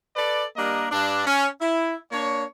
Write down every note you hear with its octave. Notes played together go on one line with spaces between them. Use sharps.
A4 B4 D5
G3 A#3 D4 A#4 D#5
G2 D4
C#4
E4
A#3 D4 C#5